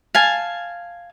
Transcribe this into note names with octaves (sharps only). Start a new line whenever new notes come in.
F5 G#5 A5